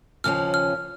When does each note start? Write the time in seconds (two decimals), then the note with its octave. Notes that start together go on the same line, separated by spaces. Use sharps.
0.24 D#2 C#3 F3 C#4 F6
0.54 F6